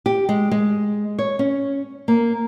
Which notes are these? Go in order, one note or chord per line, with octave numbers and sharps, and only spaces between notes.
G4
G#3
G#3
C#5
C#4
A#3